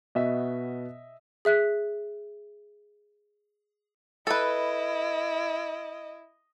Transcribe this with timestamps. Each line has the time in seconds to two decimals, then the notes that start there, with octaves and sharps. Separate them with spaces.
0.15 B2 B3 F#4 D#5 E5
1.45 G#4 E5 F#6 B6
4.27 E4 A4 B4 D#5